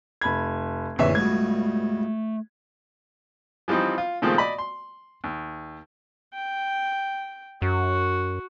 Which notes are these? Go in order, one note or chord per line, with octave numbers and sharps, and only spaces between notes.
F1 B5 G#6
A#1 F#2 D3 E3 C4 C#4 E5
C#2 G2 B2 A3 G#6
E3 F3 G3 C4 D#4
F4
A#2 D#3 F3 G#3 A3 C4
D5 D#5 B5
C6
D#2
G5
F#2 F#4